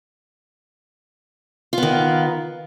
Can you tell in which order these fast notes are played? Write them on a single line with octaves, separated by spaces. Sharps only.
F4 B3 D#3